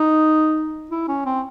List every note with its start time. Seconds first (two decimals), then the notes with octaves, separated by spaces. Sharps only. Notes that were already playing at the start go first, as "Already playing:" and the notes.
Already playing: D#4
0.91 E4
1.08 C#4
1.26 C4